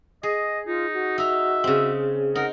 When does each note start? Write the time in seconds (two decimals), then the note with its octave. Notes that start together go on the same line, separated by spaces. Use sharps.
0.23 G#4 D#5
0.67 D#4 F4
0.94 F#4
1.18 D#4 E5 A#5
1.64 C#3 C4
2.35 D#4 A#4 F#5